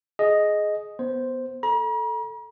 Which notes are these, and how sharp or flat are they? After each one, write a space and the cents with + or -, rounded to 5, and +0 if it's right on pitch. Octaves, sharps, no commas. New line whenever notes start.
G#4 +15 D#5 +0
B3 +0 C5 +0
A4 +0 A#5 +45